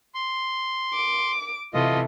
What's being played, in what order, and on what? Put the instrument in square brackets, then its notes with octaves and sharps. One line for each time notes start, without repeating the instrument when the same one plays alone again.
[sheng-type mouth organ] C6
[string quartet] D6
[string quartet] C3 E3 A3 [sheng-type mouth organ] F4 D#5